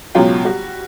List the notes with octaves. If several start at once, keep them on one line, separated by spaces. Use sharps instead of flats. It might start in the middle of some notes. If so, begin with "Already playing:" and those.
C#2 B2 F#3 F4 G5
G3 F#4